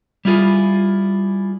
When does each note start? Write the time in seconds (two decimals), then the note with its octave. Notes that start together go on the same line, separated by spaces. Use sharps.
0.25 G3 E4 F4 G#4